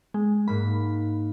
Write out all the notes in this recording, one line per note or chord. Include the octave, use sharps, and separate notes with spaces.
G#3
G#2 A#3 B5